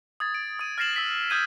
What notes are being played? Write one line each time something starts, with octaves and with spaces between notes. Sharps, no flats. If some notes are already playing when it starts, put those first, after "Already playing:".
D#6 G#6 A6
D7
D#6 D#7
F6 A6 A#6 C7 E7 F#7
E6 B6 F#7
D#6 F6 G6 G#6 D#7